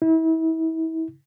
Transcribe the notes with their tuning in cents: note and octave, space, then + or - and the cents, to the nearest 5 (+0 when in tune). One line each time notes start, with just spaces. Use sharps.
E4 -35